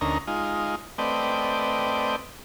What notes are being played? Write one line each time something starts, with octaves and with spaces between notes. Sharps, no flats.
D2 C#4 D#4 A#4 A#5
G#3 D#4 F4
A3 C4 B4 D5 D#5 G5